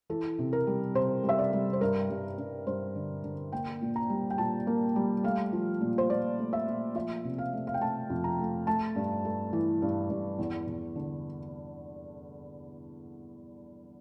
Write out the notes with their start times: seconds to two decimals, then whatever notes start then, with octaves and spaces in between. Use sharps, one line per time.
0.10 E3 A4
0.39 C3
0.53 A#4
0.67 G3
0.95 C3 C5
1.24 G3
1.29 E5
1.39 D5
1.53 G3
1.73 C5
1.81 G2 A#4
2.10 G2
2.38 G2
2.67 G2 C5
2.96 D3
3.24 D3
3.52 A#3 G5
3.81 A#2
3.96 A#5
4.10 G3
4.31 G5
4.38 A#2 A5
4.67 A#3
4.96 G3
5.24 A3 F5
5.53 F3
5.81 A#2
5.98 C5
6.10 A#2 D5
6.38 A3
6.53 E5
6.67 A#2
6.95 F3 E5
7.24 C3
7.38 F5
7.53 A3
7.67 F5
7.74 G5
7.81 A3 A5
8.10 F2
8.24 A#5
8.39 A3
8.67 A3 A5
8.96 G2
9.25 A3
9.53 E3
9.82 G2
10.10 G2
10.39 E2
10.67 E2
10.96 D3